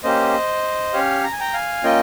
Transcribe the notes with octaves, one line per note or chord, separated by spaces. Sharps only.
A#3 C#4 G4 C5 D#5
C#4 G4 C#5 F5
A#5
G#5
G5 A#5
F5 G#5
A#3 C#4 F4 D#5 G5